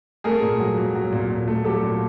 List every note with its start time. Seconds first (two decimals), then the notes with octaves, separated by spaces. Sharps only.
0.24 A3 G#4 A#4
0.41 A#2
0.60 F#3
0.78 F#3
0.95 F#3
1.12 A#2
1.31 A#2
1.48 A3
1.65 F#3 G4 A4
1.83 A#2